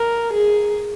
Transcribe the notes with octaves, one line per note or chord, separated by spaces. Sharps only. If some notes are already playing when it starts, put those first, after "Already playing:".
Already playing: A#4
G#4